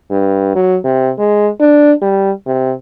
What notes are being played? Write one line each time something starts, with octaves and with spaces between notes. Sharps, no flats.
G2
F#3
C3
G#3
D4
G3
C3